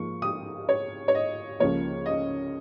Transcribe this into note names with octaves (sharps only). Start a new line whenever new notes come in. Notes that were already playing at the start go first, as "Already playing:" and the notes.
Already playing: G#2 F3 A#3 C#6
D#6
C#5
C#5
D#5
C#2 C#3 F3 A#3 C#5
D#5